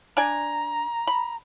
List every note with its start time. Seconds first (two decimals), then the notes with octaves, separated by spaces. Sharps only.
0.17 D4 D5 G#5 A#5
1.07 B5